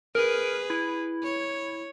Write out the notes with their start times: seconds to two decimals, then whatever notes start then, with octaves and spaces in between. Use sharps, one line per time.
0.15 G#4 A#4 B4
0.70 E4
1.23 C#5